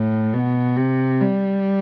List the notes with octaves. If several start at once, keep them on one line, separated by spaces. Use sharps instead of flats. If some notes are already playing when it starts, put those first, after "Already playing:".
Already playing: A2
B2
C3
G3